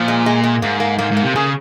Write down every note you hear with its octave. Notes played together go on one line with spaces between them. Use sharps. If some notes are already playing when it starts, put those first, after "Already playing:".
Already playing: A#2 F3
G#3
G#3
G#3
G#2 A#3
A#3
G#2 A#3
G#2
A#3
C3
C#3 G#4